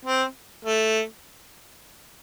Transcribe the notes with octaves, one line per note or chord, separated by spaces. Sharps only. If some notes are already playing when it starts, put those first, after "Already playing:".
C4
A3